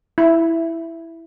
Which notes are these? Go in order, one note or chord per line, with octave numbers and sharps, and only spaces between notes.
E4